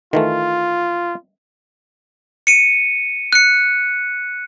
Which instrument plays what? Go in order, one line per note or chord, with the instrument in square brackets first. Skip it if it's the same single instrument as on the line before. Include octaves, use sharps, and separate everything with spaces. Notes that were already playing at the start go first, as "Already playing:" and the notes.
[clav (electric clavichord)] D#3 E3 A3 [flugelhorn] F4
[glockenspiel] C#7 D#7
F#6 C#7